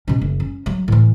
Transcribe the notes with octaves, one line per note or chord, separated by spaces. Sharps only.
B2 C#4
F#1
C#4
F#3
A2 E3